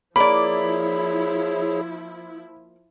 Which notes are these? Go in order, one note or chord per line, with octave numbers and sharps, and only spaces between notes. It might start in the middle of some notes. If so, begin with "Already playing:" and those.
F3 A#3 E4 G#4 C#5 D5 B5